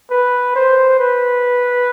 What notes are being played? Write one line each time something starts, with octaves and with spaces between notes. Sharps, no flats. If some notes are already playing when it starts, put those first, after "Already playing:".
B4
C5
B4